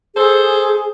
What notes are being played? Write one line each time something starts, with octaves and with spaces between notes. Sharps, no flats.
G#4 A4 C5